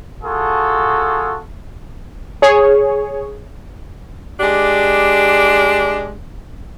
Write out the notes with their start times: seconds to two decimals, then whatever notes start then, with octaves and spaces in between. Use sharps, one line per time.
0.23 F4 F#4 G#4 A4
2.42 G#4 C#5
4.40 G#3 D4 G4